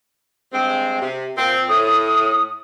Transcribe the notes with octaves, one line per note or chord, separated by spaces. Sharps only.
G2 G#3 C4
C3
A#2 C4
A2 D#6